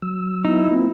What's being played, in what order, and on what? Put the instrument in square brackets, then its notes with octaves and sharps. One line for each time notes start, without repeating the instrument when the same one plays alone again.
[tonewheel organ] F#3 E6
[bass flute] B3 [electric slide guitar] D#4 [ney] E4
[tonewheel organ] A#3 F4 [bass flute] C4